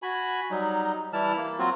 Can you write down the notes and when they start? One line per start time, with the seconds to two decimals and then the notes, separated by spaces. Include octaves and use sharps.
0.03 F#4 G#5 B5
0.51 F#3 G3 D#4
1.13 E3 G3 E4 A5 F6
1.37 A#3
1.59 F#3 C4 F4 F#4